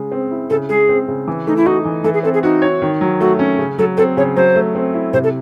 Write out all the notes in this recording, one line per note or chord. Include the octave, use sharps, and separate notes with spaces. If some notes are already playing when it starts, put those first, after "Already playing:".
Already playing: C#3 G#3
C4
E4
C#3 A4
G#3 G#4
C4
C#3
E3
A3 D#4
E4
D#4 F#4
E3
E3 A4
G#4
C4 A4
G#4
D#4 F#4
C#5
D#3
F#3
A3 F#4
C#4
C#3
F#3 A4
C4 A4
C#3 C#5
F#3 C5
A3
C4
E4
C3 C5
A4